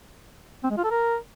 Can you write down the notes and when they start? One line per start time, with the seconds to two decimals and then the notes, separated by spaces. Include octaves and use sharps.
0.64 C4
0.71 G#3
0.77 F4
0.84 A4
0.91 A#4